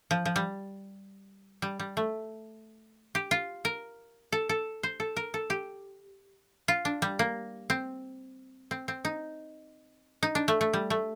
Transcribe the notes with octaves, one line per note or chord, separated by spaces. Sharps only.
F3
F3
G3
G3
G3
A3
G4
F4
A#4
A4
A4
C5
A4
A#4
A4
G4
F4
D4
G3
A#3
C4
C4
C4
D#4
D#4
D4
A3
A3
G3
A3